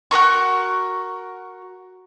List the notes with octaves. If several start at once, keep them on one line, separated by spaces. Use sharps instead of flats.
F#4 G#4 A#4 C#6